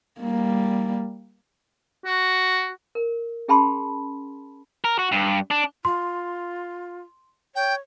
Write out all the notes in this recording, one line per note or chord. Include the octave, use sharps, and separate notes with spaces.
G3 A#3
F#4
A#4
C#4 G#4 G5 A5 B5 C6
A#4
F#4
G2
D4
F4 C6
C#5 G5